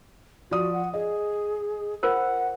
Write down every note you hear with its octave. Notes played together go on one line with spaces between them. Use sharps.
F3 F#4 D5 D#6
F#5
G#4 D#5
F4 A#4 C5 F#5